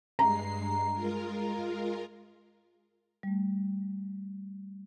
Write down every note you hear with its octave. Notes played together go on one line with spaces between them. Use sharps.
G2 G#3 A#5 C7
G#3 F4 A#4
G3 A3